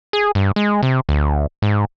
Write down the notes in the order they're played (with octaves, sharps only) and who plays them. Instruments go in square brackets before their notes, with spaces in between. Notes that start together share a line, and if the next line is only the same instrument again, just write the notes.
[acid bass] G#4
G2
G#3
C3
D2
G#2